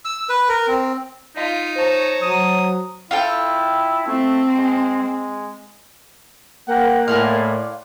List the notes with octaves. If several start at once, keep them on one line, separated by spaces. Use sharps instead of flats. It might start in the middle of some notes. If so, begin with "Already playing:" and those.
E6
B4
A#4
C4
D#4 F4 D#5 F5 B6
C5 C#5 A5 A#5
F#3 D#6
E4 F4 A4 G5
A3 C4
G#3
G#3
A#3 F#5 G5
A2 D5 F5 F#5 G#5 C6